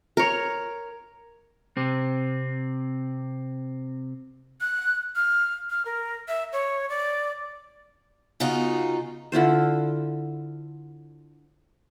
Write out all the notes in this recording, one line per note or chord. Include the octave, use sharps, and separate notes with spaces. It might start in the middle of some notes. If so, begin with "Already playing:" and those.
A#4 C#5
C3 C4
F#6
F6
F6
A#4
E5
C#5
D5
C#3 B3 D#4 F4 F#4
D3 E4 F4 C5